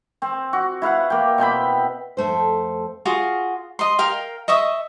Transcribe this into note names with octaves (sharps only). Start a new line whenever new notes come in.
C4
F#4
E4 B4 F5 F#5
A#3 G5
B2 C4 G5 B5
F2 A3 C5
F4 F#4 G#4
D#5 C6
A#4 F5 G5
D#5 E5 C#6 D#6